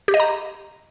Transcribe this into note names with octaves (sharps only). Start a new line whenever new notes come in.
G4
D#5
A#5